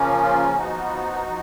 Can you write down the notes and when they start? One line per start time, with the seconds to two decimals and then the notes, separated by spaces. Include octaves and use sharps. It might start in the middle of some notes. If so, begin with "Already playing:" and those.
Already playing: C#3 F3 A#3 C#4
0.22 F4
0.57 F3 B3 D#4 F#4
1.27 F3